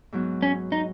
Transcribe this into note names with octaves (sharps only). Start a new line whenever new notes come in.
G#2 F#3 B3
C#4
D#4